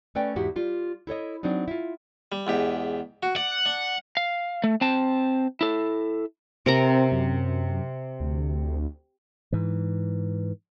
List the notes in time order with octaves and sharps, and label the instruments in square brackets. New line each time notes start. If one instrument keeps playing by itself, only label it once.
[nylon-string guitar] A3 C#4 B4 D5 G5
E2 G#2 E4 F#4 G4
G3 F4
E4 A4 C#5 D#5
F#3 C4 D4 D#4
E4 F4
[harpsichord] G3
E2 G#2 G4
F#4
[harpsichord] D5 [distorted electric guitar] F#5
[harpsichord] D4
[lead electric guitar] F5
A3
C4 A5
E4 A4
[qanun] C3 A#4 A#5 [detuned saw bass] C4
[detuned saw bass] F#2
D2
[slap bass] G#2 E3